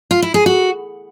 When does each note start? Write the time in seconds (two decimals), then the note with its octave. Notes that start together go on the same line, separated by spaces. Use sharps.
0.11 F4
0.22 E4
0.34 G#4
0.46 F#4